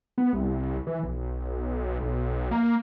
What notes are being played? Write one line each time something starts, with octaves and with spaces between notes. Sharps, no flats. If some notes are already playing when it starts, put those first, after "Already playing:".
B3
C2
E3
B1
B1
A#3